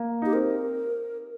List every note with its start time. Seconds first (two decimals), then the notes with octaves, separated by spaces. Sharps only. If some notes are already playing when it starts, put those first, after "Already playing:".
Already playing: A#3
0.22 D#4 G4
0.33 C4 A#4